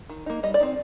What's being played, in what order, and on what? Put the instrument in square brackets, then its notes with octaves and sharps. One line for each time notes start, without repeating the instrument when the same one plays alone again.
[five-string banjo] D#3
A#3 D#4
G3 D#5
D5
C4 D#4